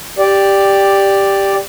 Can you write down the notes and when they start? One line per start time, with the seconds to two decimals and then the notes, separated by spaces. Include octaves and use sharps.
0.18 G4 D5